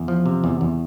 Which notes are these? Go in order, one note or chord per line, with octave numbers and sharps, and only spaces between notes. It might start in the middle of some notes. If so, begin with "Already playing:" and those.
Already playing: E2
F3
C3
E2
E2